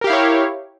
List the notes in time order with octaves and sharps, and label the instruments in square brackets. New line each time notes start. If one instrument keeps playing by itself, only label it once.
[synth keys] A#4
G4
F5
E4
C#5